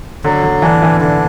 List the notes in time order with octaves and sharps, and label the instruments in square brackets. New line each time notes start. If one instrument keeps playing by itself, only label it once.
[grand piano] D3 [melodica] F#3
[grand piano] D3
[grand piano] E3 [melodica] D4
[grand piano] E3
[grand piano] D3 [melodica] D4